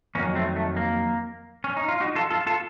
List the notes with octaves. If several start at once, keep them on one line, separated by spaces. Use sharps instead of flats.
F2 D#3 F#3 A#3 C#4
A3 C4
A3
A#3
C#4
D#4
F4
D#4 F#4
F4 A4
F4 A4
F4 A4